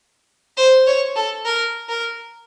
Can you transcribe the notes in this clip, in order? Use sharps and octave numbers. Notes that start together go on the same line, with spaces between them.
C5
C#5
A4
A#4
A#4